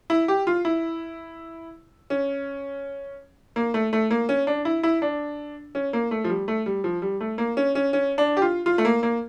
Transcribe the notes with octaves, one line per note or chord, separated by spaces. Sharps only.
E4
G4
F4
E4
C#4
A#3
A3
A3
A#3
C#4
D4
E4
E4
D4
C#4
A#3
A3
F3
G3
A3
G3
F3
G3
A3
A#3
C#4
C#4
C#4
D4
G4
F4
F4
A3
A#3
A#3